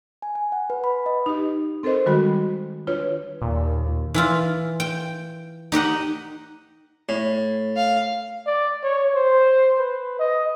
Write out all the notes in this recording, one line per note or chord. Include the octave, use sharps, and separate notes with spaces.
G#5
G#5
F#5
B4
B5
D#5
D#4 G4
C4 A4 A#4 C5 D#5
D#3 G3 G#3 F#4 B5
D4 F4 B4 C#5
D#2 A#2
E3 E4 F4
G5
D#4 G4 D#5 F#5
A2
F5
D5
C#5
C5
B4
D#5